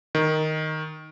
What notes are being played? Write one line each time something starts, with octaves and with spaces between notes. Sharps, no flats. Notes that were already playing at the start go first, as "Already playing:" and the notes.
D#3